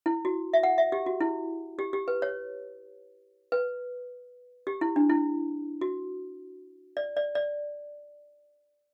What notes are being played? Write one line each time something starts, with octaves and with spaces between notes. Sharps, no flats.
E4
F#4
E5
F#5
E5
G4
F#4
E4
G4
G4
B4
C#5
B4
G4
E4
D4
E4
F#4
D5
D5
D5